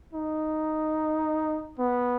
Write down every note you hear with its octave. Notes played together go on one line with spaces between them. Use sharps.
D#4
B3